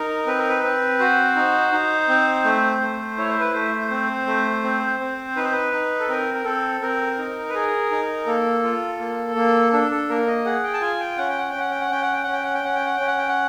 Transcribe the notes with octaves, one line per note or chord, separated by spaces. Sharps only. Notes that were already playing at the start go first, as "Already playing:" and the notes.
Already playing: D#4 A#4
C4 B4
A#4
B4
C4
F#4 C5
D#4
D#4
C4
A3
A3
E4 C#5
C5
B4
A3 C5
C4
A3
C4
C4
D#4 B4
C5
B4
D#4
A4
C4 A#4
A#4
C4 A4
C4 A#4
D#4
B4
G#4 A#4
D#4
A#3 A4
F4
A#3
A#3
D4 A4
A4
A#3 A#4
D#5
G#4 F#5
G5
A5
F4 G#5
G5
C#4 F#5
G5
F#5
G5
C#4 F#5
G5
F#5
C#4 G5
F#5
G5
C#4 F#5
G5
F#5
G5
C#4 F#5
G5
F#5
C#4 G5
F#5
G5
F#5